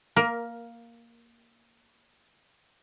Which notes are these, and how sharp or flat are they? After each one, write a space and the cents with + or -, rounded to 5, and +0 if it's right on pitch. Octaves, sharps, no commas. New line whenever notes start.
A#3 +0 A#4 +15